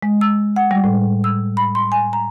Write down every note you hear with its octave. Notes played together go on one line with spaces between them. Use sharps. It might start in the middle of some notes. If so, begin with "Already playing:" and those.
G#3
E6
F#5
G3
A2
E6
B5
C6
G#5
A#5